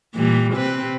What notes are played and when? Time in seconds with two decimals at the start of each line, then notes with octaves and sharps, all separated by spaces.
0.15 A#2 E3 G3
0.54 C3 C4 B4